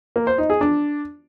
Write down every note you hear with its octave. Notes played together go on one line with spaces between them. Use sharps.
A#3
C5
D#4
G#4
D4